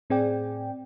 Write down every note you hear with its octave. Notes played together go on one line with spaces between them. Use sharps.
A2 C4 G#4 D5 G5